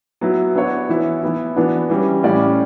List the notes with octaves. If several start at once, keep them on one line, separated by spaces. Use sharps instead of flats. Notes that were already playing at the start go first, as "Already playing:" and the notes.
F#3 B3 E4
B3 D4 F#4 C#5
E3 B3 E4
E3 B3 E4
E3 B3 D4 F#4
E3 G3 C#4
A2 G3 C#4 G4 D5